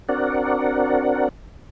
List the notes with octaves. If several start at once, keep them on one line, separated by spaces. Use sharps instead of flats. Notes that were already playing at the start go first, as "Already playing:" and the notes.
C4 D4 F#4 A#4 D5 F#5